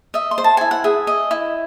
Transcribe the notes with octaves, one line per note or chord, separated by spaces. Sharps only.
D#5 E5
C6
C5
A5
E4 G#5
F#5
G#4 E5
D#5
E4